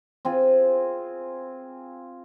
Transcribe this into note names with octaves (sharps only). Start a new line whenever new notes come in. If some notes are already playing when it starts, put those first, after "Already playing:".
C4 F4 G#4